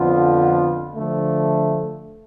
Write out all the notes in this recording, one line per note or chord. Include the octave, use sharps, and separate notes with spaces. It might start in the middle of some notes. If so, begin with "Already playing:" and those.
Already playing: F2 D3 F3 B3 F4
D3 F3 A3